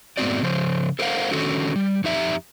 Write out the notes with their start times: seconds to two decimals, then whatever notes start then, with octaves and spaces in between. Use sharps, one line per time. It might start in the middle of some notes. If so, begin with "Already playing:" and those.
0.17 G#2 A3 B3 C4 F#4 D5
0.43 C#3 F3 C5
0.99 A4 A#4 C5 D5 F5 F#5
1.31 D3 D#3 C#4 F#4 A4
1.76 G3
2.04 F2 D#4 G4 E5 A#5